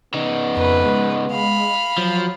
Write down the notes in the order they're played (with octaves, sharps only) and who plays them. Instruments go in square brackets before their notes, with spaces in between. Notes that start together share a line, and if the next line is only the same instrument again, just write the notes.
[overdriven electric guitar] C#3 D#4 [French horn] B3
[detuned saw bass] F2 [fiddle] B4
[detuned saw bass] G#3
[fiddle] F5 B5
[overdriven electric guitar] F3 [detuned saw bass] F#3